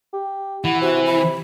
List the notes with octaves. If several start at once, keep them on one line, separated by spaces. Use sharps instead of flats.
G4
E3 F#5
C3 F#4
B5